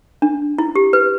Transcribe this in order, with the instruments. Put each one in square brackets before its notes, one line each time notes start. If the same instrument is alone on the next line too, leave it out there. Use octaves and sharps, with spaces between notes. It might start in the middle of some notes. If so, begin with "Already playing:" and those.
[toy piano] D4
E4
G4
B4